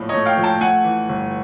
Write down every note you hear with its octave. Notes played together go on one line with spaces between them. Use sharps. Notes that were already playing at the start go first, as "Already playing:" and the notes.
Already playing: A#1 A2 F3 A3
C#5 D#5
A3
F5 G5
F3
G5 A5
A3 F#5 G#5
E3
G1